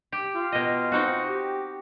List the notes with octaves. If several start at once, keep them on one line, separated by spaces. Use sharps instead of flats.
G4
F4
B2 D#5
C4 D#4 F#4
G4